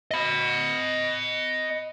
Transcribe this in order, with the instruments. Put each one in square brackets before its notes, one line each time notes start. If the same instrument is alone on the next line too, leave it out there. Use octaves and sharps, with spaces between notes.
[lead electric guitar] D#5 B5